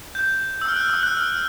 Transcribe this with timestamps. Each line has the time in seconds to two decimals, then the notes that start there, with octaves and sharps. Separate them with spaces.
0.15 G6
0.61 E6
0.68 F6
0.76 F#6
0.90 E6
1.03 F#6
1.17 F6